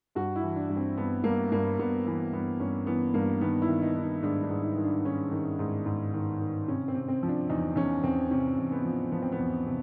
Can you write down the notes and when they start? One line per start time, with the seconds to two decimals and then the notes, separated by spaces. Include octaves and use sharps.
0.15 G2 F#4
0.36 E4
0.43 E3
0.56 D4
0.69 G2
0.76 C4
0.97 G2 B3
1.24 G2 A#3
1.52 G2 A#3
1.79 G2 B3
2.06 E3 B3
2.33 G2 B3
2.60 G2 C#4
2.87 E3 B3
3.14 G2 A#3
3.41 D#3 B3
3.62 E4
3.68 D#3
3.82 D#4
3.96 D#3
4.03 D#4
4.23 G#2 D4
4.43 D4
4.50 G#2
4.63 D#4
4.77 D#3
4.84 D4
5.05 D#3 C#4
5.31 D#3
5.59 G#2
5.86 G#2
6.14 D#3
6.40 D#3
6.68 C3 C#4
6.88 C4
6.94 C3
7.08 C4
7.23 F3
7.28 D4
7.49 E2 D#4
7.76 E2 C#4
8.03 E2 C4
8.31 C3 C#4
8.57 E2
8.72 B3
8.85 F3
9.12 F3 B3
9.22 C4
9.32 B3
9.39 E2
9.66 C3